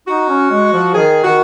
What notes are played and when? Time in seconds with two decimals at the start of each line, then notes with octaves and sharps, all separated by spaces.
0.08 D#4 F#4
0.29 C#4
0.51 G#3
0.73 F3
0.94 D#3 G#4
1.24 D#3 F#4